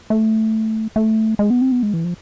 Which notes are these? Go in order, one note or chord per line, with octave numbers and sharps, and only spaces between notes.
A3
A3
G#3
B3
C4
B3
G#3
E3
F3